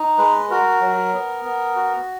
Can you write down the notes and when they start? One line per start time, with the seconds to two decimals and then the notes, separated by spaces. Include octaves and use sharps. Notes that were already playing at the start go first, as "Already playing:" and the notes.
Already playing: D#4
0.18 G#3 B4
0.51 F#4 A#4
0.81 F#3
1.13 B3
1.45 B3
1.76 F#4